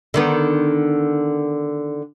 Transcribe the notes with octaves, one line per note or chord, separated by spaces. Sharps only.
D3 D#3 B3